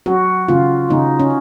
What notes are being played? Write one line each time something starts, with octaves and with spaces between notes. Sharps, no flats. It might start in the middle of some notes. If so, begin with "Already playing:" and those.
F#3 F#4
C#3 F4
C#3 D#4
C#4